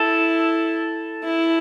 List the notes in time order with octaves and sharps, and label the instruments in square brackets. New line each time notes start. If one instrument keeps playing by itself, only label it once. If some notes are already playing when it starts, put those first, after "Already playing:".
Already playing: [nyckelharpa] E4 [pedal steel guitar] A4
[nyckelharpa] E4